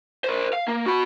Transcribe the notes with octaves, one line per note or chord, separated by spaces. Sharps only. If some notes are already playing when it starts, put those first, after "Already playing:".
A#4 C5
F5
A#3
F#4 B5